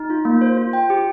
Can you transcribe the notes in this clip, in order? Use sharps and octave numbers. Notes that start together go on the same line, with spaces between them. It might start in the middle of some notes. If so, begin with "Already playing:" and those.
Already playing: D#4
F4
A#3
C5
F4
G5
G4